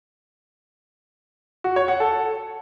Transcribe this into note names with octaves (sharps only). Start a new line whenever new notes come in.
F#4
C#5
F#5
A4